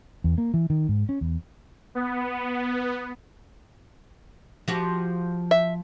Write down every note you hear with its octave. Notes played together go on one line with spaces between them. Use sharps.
E2
A#3
E3
D#3
G#2
C#4
E2
B3
F3 F#4 G4
E5